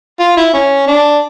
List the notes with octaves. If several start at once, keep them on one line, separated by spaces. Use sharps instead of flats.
F4
E4
C#4
D4